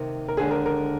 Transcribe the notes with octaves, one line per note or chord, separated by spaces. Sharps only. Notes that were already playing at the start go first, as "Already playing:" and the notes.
Already playing: C3 D#3 A#3
A#4
D#2 D3 G#3 G#4
A#4
A#4